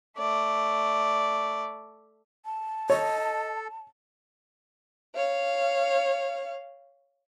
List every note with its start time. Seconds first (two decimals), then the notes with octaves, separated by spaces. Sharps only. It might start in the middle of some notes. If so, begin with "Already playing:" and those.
0.18 A3 D5
2.45 A5
2.90 A4 C#5 D#5
5.16 C#5 F5